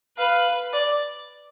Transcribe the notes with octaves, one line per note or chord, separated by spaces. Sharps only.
B4 F5
D5